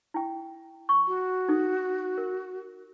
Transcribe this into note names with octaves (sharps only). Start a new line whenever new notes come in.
E4 G5
C#6
F#4
D#4 A4 D#6
A#4